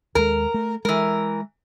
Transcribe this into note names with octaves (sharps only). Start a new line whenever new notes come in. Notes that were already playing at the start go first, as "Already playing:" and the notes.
D#2 G#3 A#4
A3
E3 G#3 A#4